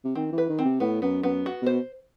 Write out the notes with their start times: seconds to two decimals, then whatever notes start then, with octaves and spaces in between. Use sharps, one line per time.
0.04 C3
0.15 D#3 C4
0.32 E3
0.38 B4
0.49 D#3
0.59 C4
0.65 C3
0.80 A2 B3
1.02 F#2 B3
1.23 F#2 B3
1.46 F#4
1.62 B2 C5